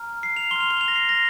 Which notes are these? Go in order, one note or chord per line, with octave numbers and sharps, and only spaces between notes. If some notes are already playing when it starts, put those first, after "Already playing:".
Already playing: A#5 F6
C7
F7
C6 F6 F7 G7
G7
F7
A#6
C7
A#6